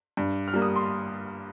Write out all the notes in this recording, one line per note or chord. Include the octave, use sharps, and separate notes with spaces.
G2
F6
G3 A#3
D#6
C6